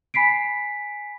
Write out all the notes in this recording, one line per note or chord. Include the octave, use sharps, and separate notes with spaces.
G#5 B5 B6 C7 D7